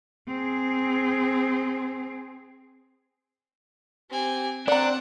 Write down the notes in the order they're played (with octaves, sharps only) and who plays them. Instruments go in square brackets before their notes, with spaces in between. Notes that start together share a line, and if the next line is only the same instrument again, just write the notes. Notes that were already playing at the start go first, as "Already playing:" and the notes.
[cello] C4 G#4
[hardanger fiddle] C4 G#5 [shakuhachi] G4
[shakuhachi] C4 [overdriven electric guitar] D4 [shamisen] D5 A#5 [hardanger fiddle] F#5